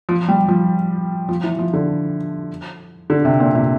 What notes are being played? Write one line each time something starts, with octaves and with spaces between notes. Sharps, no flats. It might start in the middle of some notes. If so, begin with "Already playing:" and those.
F3
G3
F3
F3
E3
F3
D3
D3
C3
A#2
C3